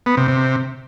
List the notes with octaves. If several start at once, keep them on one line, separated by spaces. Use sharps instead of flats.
B3
C3
C3